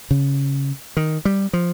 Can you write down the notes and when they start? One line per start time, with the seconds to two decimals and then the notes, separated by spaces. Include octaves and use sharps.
0.11 C#3
0.97 D#3
1.25 G3
1.53 F3